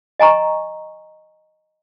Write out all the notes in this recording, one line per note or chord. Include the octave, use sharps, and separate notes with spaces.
D#5 G#5 A#5 C#6